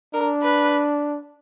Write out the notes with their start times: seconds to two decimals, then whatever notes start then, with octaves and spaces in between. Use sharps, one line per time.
0.14 D4 A#4
0.43 B4